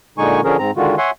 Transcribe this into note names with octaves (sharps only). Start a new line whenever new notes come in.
A#2 D3 G#3 D#4 G#5 C#6
D3 F3 C#4 G#4 A#4
G#2 C4 A#5
D3 D#3 G#3 F4 F#4
C#5 E5 F#5 G#5 C6